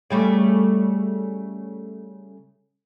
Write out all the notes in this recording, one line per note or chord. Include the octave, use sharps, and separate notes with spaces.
C#3 G3 A3